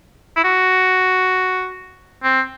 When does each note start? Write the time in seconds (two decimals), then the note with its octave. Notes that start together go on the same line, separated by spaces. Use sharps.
0.36 E4
0.44 F#4
2.23 C4